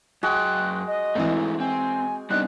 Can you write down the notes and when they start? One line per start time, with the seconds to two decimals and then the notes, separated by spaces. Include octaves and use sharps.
0.23 F#2 G#3 F#4 G5 F#6
0.87 D#5
1.15 G#1 E3 A3 C4 E4
1.60 C4 G#5
2.30 G3 B3 C4 D4 D#4 F#6